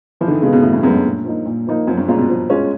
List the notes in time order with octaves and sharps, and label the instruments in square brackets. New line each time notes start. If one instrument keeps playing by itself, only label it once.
[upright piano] E3 [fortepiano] F3
[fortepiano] D3
D#3
[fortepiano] C#3 [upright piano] G#3
[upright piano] B3
[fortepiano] B2
[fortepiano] A2 [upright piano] E3
[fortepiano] G2
[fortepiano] F#2 [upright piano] G#3 B3
[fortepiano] G2
[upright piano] A#2
F3 A#3 D#4
A#2
F3 A#3 D#4
[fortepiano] F#2 [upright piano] F3
[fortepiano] G2
[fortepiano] A#2 [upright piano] G#3 C#4 F4
[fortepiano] B2
[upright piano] F3
G#3 C#4 F4